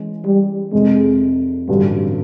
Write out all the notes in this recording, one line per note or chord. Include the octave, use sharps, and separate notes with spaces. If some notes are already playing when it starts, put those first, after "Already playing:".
Already playing: E3 G#3 C#4
G3
F1 F2 C3 G#3
A1 G2 D3 F#3 G3